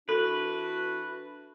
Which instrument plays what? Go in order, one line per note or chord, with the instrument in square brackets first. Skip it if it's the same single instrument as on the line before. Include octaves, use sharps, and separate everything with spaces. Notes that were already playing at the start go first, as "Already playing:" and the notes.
[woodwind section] E3 D4 F#4 [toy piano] A4 [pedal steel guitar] B4